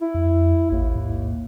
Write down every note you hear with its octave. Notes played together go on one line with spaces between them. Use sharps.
E4
F2
A1 D#2
G#2